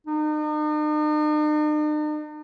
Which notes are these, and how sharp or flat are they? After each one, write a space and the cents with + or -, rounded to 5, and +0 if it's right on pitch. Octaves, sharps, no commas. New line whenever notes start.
D#4 -45